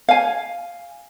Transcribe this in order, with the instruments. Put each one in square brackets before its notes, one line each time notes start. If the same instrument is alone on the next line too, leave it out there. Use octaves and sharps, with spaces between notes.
[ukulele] F5 G#5